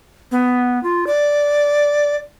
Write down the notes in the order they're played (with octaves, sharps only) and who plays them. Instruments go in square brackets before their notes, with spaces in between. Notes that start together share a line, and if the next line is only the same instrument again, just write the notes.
[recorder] B3
F4
D5